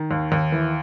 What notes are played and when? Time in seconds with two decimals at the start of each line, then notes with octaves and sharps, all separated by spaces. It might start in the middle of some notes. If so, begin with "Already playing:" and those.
Already playing: D#3
0.11 D#2
0.32 D#2
0.52 E3